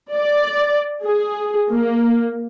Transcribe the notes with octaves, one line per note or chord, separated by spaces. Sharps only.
D5
G#4
A#3